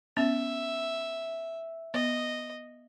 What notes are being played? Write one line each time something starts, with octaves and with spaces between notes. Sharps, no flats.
B3 C#4 E5
B3 D#5